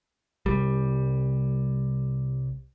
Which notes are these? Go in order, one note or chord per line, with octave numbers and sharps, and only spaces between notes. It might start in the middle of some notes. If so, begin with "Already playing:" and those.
C2 G3